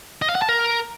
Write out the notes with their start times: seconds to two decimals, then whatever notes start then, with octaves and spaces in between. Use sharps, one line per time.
0.22 D#5
0.29 F5
0.35 F#5
0.42 A5
0.49 A#4